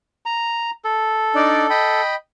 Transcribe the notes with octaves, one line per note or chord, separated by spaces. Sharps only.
A#5
A4
D4 D#4 D5
D#5 G5 B5